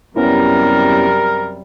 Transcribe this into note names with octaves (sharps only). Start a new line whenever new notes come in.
F#2 C3 G3 B3 C#4 E4 A#4